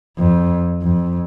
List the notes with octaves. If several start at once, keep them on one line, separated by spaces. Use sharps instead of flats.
F2
F2